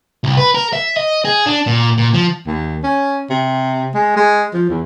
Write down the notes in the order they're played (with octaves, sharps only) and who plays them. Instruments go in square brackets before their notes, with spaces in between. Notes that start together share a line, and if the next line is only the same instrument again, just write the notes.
[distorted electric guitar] C2
B4
A#4
E5
D#5
G#4
D4
A#2
A#2
F3
[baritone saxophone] D#2
C#4
C3
G#3
G#3
F3
E2